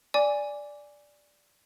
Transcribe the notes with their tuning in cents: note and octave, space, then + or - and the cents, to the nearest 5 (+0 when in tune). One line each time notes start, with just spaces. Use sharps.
D5 -5 G#5 -5 D6 -15